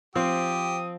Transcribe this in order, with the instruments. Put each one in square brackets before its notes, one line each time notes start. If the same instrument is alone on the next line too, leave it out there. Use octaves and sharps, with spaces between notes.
[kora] F3 [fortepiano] C4 [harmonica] G4 [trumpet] D#6